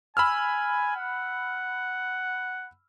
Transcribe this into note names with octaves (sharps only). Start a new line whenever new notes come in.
G#5 B5 E6 F6
F#5